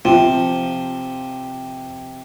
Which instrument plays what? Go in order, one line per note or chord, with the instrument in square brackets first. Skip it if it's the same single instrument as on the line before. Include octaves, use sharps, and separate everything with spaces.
[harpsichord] C3 [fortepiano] F3